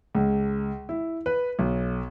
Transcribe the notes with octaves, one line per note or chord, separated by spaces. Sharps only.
C#2
E4
B4
B1